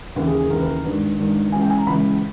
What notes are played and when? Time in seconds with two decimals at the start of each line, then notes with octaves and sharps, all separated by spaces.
0.16 D#2 C#3 E3 B4
0.27 G#4
0.39 G#4
0.50 D#2 C#3 E3 A#4
0.60 B4
0.67 A#4
0.84 G#1 G2 D#3 B4
1.18 G#1 G2 D#3
1.52 C#2 C#3 E3 G#5
1.62 G5
1.70 G#5
1.78 A#5
1.87 C#2 C#3 E3 B5